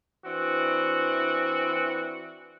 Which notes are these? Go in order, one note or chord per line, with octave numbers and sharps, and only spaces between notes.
E3 C4 D4 F#4